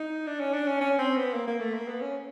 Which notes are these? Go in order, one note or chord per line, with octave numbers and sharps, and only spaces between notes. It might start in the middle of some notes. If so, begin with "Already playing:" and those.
Already playing: D#4
D4
C#4
D4
C#4
C#4
C4
B3
A#3
A#3
A3
A#3
B3
C#4